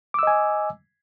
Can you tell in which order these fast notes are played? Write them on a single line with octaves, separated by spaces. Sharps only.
D6 E6 D#5 G#5